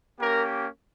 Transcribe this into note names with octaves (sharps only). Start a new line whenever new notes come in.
A#3 C#4 G4 A#4